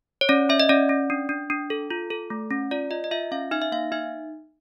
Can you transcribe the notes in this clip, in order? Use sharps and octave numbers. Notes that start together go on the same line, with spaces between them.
C#5
C#4 D5
C#4 E5
D#5
C#4 D5
C#4
D4
D4
D4
A4
F4
A4
A3
C#4
F4 D5
F4 D#5
D#5
F4 E5
C#4 F5
D#4 E5
E5
A#3 F5
D#4 E5